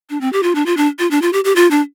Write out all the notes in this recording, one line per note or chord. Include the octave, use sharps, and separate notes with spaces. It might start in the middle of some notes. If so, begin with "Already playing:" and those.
D4
C4
G4
F4
D4
F4
D4
F4
D4
F4
G4
G4
F4
D4